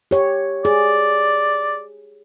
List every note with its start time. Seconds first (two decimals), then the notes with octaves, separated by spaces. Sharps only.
0.11 G4 C#5
0.65 G#4 D5